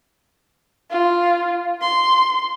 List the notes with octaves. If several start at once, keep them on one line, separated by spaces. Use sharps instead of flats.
F4
C6